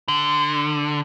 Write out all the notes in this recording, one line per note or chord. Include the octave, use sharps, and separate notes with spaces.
D3